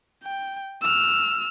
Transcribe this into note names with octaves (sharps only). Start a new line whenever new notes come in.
G5
E6 F6